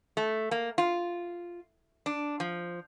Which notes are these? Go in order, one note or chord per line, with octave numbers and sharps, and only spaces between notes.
A3
A#3
F4
D4
F3